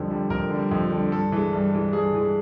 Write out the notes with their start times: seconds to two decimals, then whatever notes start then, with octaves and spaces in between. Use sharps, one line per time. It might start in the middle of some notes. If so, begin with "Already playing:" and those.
Already playing: F2 D3 G3
0.10 D3 G3
0.30 F2 A#4
0.50 D3 G3
0.71 F2
0.91 D3 G3
1.12 G2 A4
1.32 E3 G#3
1.53 G2
1.73 E3 G#3
1.93 G2 G#4
2.14 E3 G#3